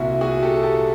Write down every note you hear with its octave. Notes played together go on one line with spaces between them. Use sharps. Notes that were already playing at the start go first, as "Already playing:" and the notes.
Already playing: C2 A#2 E4 F#4
F#4 G#4
G4 A4
G4 A4